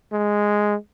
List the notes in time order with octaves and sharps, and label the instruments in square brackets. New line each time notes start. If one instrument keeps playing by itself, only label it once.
[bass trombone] G#3